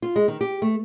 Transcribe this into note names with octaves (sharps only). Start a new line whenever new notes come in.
F4
G#3
D#3
G4
A3